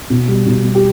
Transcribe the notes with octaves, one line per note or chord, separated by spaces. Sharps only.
B2
G3
B2
G3
G4